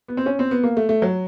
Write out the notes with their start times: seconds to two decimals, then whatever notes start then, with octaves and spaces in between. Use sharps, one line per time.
0.08 B3
0.17 C4
0.26 C#4
0.39 C4
0.51 B3
0.63 A#3
0.77 A3
0.89 A3
1.02 F#3